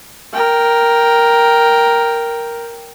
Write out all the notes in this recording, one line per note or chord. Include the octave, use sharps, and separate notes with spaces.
A#4 G5